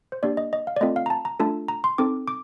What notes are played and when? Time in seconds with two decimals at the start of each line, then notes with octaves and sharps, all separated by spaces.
0.12 C5
0.23 A#3 D4 G4 D5
0.37 D#5
0.53 D#5
0.67 F5
0.76 D5
0.81 A3 C4 F4 A4 D#5
0.96 F5
1.06 A#5
1.10 A5
1.25 A#5
1.40 A3 D4 F4 A4 A5
1.68 A#5
1.84 C6
1.98 C4 D#4 A4 D6
2.28 D6